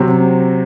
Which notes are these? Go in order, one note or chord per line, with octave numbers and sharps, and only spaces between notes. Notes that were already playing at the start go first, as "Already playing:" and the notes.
Already playing: C3 F#3 C4